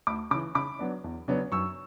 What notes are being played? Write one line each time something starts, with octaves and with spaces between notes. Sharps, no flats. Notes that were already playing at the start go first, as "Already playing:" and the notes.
D2 B5 D6
C#3 E3 B5 D6
C#3 B5 D6
F#3 B3 D4
E2
C#3 F#3 B3 D4
F#2 C#6 E6